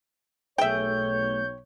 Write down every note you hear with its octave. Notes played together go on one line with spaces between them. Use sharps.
B1 A3 G#4 C#5 E5 G5 G6